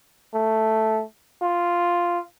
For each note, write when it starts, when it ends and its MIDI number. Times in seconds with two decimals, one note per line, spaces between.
0.34 1.02 57
1.42 2.20 65